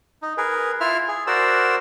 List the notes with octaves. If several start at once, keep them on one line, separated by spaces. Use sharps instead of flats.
D#4
G#4 A#4 B4
E4 F4 E5 F6
G#4
F#4 A#4 C5 D5 E6